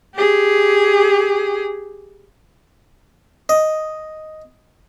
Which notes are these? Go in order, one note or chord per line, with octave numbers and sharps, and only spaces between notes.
G4 G#4
D#5